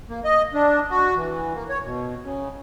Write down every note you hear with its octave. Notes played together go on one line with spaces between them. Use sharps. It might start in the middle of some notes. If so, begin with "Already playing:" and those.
A#3
D#5
D4
F#4
E3
A#3
C#5
B2
C#3